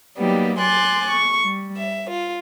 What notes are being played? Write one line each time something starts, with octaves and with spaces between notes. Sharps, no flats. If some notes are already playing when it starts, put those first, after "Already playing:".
F#3 G3 A#3 B3 D#4 G4
G#5 C6 D6 F#6 A6
C#6
G3
E5
F4